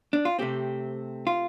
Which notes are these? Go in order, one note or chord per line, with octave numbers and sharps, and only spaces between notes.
D4
F4
C3 A3 C4 G4
F4